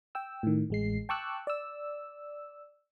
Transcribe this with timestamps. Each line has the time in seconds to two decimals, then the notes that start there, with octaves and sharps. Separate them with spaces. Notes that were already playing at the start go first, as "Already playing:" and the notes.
0.15 G5 E6
0.43 A2 D#3
0.70 A1 G#3 C7
1.09 G5 A5 C#6 D6 E6 F#6
1.47 D5 E6